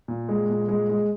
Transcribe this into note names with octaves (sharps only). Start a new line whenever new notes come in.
A#2
G#3
A#2
G#3
G#3